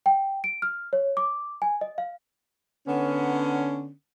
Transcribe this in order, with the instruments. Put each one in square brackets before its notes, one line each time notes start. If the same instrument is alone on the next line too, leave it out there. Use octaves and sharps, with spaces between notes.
[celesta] G5
D7
F6
C#5
D6
G#5
D#5
F5
[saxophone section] D3 B3 C#4